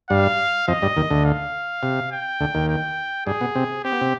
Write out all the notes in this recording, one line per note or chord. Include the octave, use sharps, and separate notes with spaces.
G2 G3 F5
F2 F3 D#5
G2 G3
D#2 D#3
D2 D3
F5
C3
G5
D2 D3
D#2 D#3
G5
G2 G3 G#4
B2 B3
C3 C4
C4 G4
B3
C3 C4